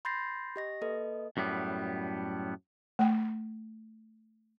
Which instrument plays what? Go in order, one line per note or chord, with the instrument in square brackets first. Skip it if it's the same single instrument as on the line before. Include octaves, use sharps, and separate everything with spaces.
[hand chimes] B5 C6 G6 A6 A#6 C7
G4 D#5 A#6
A#3 A4 B4 D#5
[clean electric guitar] F#2 A2 G3 B3
[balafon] A3 G5